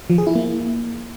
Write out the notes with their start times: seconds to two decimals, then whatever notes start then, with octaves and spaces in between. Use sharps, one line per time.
0.10 F3
0.18 G#4
0.27 E4
0.35 A#3